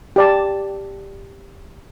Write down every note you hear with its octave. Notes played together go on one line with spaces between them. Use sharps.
G4 D5 A5